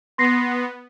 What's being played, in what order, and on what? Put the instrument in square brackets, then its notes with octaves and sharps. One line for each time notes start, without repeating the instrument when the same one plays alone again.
[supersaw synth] B3 [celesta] C6 A#6 C7